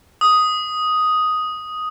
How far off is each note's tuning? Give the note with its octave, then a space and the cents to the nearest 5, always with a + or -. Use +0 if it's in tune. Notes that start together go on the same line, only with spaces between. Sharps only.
D#6 +5